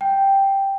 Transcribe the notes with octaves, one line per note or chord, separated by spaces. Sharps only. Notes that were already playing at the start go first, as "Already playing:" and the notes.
G5